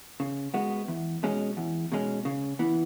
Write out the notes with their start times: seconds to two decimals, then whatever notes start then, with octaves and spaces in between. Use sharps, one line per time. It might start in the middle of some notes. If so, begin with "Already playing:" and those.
0.20 C#3
0.54 G#3 B3 F#4
0.88 E2
1.23 B2 G#3 C#4
1.57 E2
1.92 B2 G#3 C#4
2.25 C#3
2.59 E3 B3